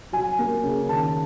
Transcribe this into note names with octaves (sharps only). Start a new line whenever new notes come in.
F#3 G#5
A#3
C#3
D#3 A5